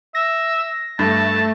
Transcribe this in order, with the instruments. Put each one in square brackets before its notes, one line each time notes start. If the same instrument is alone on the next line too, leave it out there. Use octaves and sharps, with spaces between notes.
[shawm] E5 [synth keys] A#6
[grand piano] G2 [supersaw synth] A3 [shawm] A5